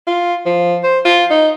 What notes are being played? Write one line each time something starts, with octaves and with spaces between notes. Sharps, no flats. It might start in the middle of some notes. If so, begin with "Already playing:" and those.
F4
F3
C5
F4
D#4